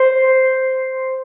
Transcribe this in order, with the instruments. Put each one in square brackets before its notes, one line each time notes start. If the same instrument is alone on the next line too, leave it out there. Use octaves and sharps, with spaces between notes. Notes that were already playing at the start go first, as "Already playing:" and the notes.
Already playing: [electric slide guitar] C5